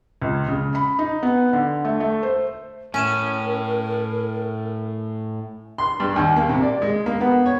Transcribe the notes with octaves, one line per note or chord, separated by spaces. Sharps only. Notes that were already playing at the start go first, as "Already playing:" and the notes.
C#2
C#3
B5
D#4
B3
D3
A3
A3
C5
A2 C#4 A#4 G#5 D#7 E7
C6
G2
D#2
A#3
C3
D5
G#3
A#3
B3
C#5